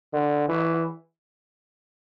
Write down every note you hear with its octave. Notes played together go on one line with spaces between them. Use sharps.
D3
E3